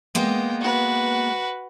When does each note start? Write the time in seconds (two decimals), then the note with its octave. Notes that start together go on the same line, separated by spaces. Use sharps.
0.15 G#3 A#3 B3 G5
0.61 F#4 B4